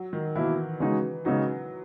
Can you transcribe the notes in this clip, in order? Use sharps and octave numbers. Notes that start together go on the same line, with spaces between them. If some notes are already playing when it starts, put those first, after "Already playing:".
Already playing: F#3
D#3
B2 E3 A#3 E4
C#3 G#3 D#4 F#4
C#3 F#3 G#3 D#4 F#4